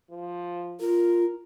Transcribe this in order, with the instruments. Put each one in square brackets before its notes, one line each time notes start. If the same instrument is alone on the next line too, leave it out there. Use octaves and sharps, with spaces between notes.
[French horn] F3
[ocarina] F4 [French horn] A#4